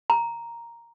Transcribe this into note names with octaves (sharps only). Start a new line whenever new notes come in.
A#5